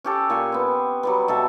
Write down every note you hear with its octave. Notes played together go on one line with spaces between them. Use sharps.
C#4 G4 A4
A#2 G#5 C#6
B3 C4
F#3 G3 B3
B2 A4 E5